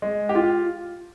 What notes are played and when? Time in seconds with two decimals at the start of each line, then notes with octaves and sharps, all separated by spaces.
0.02 G#3
0.29 G4
0.35 F4